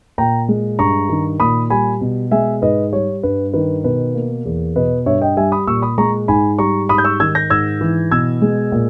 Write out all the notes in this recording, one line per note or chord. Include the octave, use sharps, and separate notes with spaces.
A#2 G5 A#5
G#3
G2 A#5 C#6
D#3
A#2 B5 D#6
G3 G#5 B5
B2
G#3 E5 G#5
G#2 B4 D#5
G3 C#5
G2 B4
D#3 B4
B2 B4
A#3
E2
B2 B4 D#5
G2 C#5 E5
D#5 G5
G3 E5 G#5
B5 D#6
A#2 C#6 E6
B5 D#6
G#3 A#5 C#6
G#2 G#5 B5
G3 A#5 C#6
G#2 B5 D#6
G6
C#6 E6
D#3 E6 G#6
G6 A#6
G#2 E6 G#6
E3
B2 E6 G#6
G#3
A#2